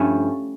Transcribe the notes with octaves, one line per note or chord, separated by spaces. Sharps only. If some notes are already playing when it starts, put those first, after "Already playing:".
Already playing: G2 F3 A3 C#4 E4